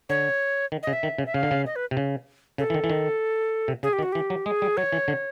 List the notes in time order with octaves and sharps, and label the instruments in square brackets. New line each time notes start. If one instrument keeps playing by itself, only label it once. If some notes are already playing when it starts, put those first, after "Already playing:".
[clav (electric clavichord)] D3 [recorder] C#5
[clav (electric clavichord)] D#3
[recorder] D#5
[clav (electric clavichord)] C#3
[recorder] E5
[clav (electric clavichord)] D#3
C#3
[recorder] E5
[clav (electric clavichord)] C#3 [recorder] F5
[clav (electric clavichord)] D3
C#3
[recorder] D#5
B4
[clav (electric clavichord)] C3
C#3
[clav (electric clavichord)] C#3 [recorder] A4
[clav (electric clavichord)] E3
D#3
E3
D#3
C3
[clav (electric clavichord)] C#3 [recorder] G#4
[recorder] G4
[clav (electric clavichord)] D#3
[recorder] F#4
[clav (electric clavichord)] E3 [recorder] G4
[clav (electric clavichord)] F#3
[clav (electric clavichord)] G#3 [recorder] G#4
[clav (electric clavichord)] G3
[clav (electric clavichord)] F#3 [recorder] C#5
[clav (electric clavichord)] E3
D3